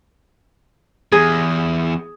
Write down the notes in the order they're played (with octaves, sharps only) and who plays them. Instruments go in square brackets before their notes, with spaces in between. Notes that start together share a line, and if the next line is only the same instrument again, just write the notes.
[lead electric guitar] E2 [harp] G#4